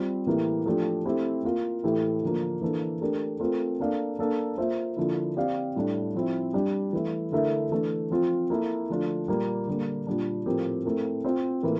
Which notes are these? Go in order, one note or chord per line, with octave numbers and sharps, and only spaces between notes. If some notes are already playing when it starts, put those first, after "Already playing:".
Already playing: G3 C4 F4
A2 E3 A#3 E4 G4
F3 A3 D4 G4
A3 C4 E4 G4
A#3 F4 A#4 F5
A2 E3 A3 E4 G4
D3 F3 A#3
E3 A#3 D4 A4
A3 D4 G4 A#4
A3 C4 F4 A#4
A#3 D4 A4 D5 F5
A#3 D4 A4 D5 F5
A#3 F4 C5 E5
D3 F3 A#3 E4
C4 G4 D5 F5
A2 G3 D4
F3 C4 E4
G3 D4 G4
E3 A3 E4
D3 A3 E4 A#4 E5
E3 A3 D4
F3 C4 F4
A#3 E4 A4
D3 F3 A3 D4 F4
A#2 G3 A#3
D3 G3 A#3
A#2 G3 D4
A2 F3 C4 G4 A#4
A3 C4 E4 A#4
C4 F4 C5
A2 E3 A#3 E4 A#4